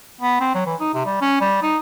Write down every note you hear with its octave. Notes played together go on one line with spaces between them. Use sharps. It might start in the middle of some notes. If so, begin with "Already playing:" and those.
B3
C4
F#3
E3
D#4
C3
G3
C#4
G3
D#4